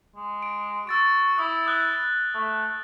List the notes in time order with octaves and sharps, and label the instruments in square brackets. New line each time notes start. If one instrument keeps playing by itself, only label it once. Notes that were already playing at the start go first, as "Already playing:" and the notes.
[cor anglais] G#3
[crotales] D7
[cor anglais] F#4 [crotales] E6 A6 D7
[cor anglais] E4 [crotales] D#6
[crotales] D#6 F#6 G7
[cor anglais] A3